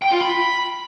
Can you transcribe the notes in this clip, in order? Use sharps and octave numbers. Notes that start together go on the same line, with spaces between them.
G5
F4
B5